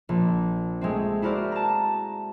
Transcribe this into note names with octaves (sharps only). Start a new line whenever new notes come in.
A#1
G#3 A3 C4
E4 F#4 A#4 C5 D5
A5 A#5